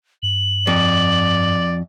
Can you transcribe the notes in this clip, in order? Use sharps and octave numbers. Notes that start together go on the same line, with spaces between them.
G2 F#7
F2 D5